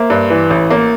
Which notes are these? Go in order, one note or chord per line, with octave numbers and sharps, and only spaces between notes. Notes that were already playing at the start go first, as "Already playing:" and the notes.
Already playing: A#3 C5 E5
G2
E3
A1
A#3